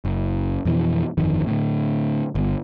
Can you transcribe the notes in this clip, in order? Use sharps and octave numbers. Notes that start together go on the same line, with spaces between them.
F#1
F2 B2 D#3 E3
G1 F2 D#3
A2 D3
G1